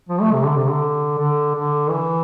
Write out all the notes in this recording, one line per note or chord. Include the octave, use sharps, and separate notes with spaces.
F3
A3
C3
D3
C3
D3
D3
D3
E3